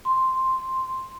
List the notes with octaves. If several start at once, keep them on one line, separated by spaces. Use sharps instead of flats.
C6